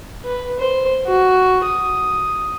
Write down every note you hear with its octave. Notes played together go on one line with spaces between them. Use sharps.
B4
C5
F#4
D#6